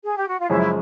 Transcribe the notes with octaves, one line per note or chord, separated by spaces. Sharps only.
G#4
G4
F#4
F4
F#2 C#3 F3 G#3 C#4 E4